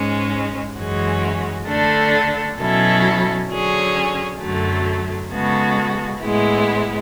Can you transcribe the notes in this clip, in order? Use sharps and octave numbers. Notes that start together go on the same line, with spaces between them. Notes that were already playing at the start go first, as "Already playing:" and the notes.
Already playing: G#2 G#3 C#4
F#2 E3 G#3 C#4 F#4
D3 A3 D4 A4
B2 F#3 C#4 E4 A4
D3 F#3 C#4 G#4
F#2 D3 F#3 A3
C#3 G#3 B3 F#4 A4
A2 G#3 B3 E4